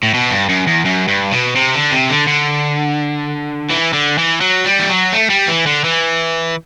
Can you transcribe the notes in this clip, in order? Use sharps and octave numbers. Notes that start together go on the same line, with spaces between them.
A2
B2
G2
F#2
E2
F#2
G2
B2
C3
D3
C3
D3
D3
E3
D3
E3
F#3
G3
E3
F#3
A3
G3
E3
D3
E3